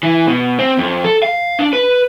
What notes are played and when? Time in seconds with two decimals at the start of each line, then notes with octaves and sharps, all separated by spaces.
0.03 E3
0.27 B2
0.59 C4
0.78 F2
1.04 A4
1.23 F5
1.59 D4
1.73 B4